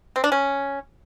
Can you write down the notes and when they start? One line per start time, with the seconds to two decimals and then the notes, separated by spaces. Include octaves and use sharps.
0.16 C4
0.24 D4
0.32 C#4